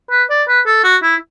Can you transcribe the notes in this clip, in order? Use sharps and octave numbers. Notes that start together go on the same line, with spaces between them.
B4
D5
B4
A4
F#4
E4